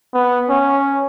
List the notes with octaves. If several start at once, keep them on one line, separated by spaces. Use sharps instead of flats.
B3
C#4